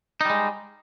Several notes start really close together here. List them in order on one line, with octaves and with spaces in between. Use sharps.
D#4 G3 G#3